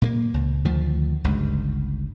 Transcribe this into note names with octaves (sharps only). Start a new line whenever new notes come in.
A#2 A3 A#3
C#2
D2 D#3 F3 A3
G1 C#2 G2